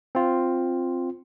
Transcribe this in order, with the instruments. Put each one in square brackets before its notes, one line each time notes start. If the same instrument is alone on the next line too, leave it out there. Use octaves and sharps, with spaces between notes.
[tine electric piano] C4 F4